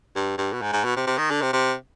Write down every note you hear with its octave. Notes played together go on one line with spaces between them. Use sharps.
G2
G2
B2
G#2
G#2
B2
C3
C3
D#3
D3
C3
C3